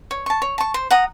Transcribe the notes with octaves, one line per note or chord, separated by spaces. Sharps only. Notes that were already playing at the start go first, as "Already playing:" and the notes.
C#5
A5 C#6
C#5
A5 C#6
C5
F#5 A#5 D#6